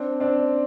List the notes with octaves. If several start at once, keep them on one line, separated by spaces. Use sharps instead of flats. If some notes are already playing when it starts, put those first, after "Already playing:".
Already playing: C4 D4
C4 D4